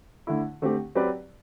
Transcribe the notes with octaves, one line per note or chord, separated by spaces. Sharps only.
D3 A3 E4
D3 A3 C4 G4
F#3 C4 G4 B4 D5